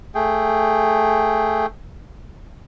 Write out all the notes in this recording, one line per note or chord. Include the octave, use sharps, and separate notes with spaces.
A3 G#4 G5